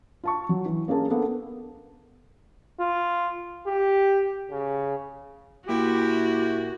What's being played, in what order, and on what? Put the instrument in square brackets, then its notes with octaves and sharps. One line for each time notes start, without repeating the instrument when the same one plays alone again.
[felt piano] F4 A5 C#6
F#3
E3
A#3 C#4 G#4 A#4 A5
A#3 B3 D4 A4
[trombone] F4
G4
C#3
[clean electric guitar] A#2 A#3 [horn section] E4 G4 [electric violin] F#4